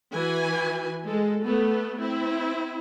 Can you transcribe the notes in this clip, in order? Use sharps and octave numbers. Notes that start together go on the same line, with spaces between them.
E3 F#4 B4 G#5
G#3 A4
A3 B3 A4
C4 E4